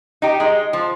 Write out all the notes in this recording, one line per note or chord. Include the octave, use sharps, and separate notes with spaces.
D#4 G4
G#3
F3